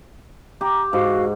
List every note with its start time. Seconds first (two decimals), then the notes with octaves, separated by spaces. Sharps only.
0.61 G4 A#5
0.93 G#2 F#4 F5